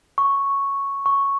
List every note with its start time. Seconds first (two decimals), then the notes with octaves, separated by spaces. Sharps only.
0.18 C#6
1.06 C#6